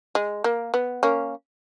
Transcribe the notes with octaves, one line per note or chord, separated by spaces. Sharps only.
G#3
A#3
B3
A#3 C#4